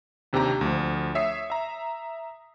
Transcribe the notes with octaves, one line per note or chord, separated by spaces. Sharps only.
D#2 C3 D4 G4 A#5
D2 F3
C#5 E5 D#6 C7
E5 A#5